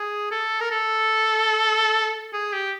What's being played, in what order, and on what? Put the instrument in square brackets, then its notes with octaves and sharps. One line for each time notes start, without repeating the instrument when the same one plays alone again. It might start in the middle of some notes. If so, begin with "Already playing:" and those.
Already playing: [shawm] G#4
A4
A#4
A4
G#4
G4